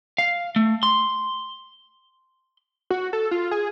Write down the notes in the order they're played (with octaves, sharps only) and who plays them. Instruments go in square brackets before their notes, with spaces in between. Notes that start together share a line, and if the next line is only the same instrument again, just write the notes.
[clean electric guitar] F5
A3
C6
[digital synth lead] F#4
A4
F4
G#4